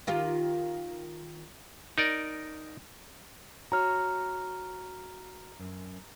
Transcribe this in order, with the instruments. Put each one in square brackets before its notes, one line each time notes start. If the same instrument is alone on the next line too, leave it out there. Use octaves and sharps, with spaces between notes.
[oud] D#3 F4 G4
[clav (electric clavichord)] D#4 A#4 D5
[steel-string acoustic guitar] F#4 C#5 [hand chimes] A#5 F6
[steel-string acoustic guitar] F#2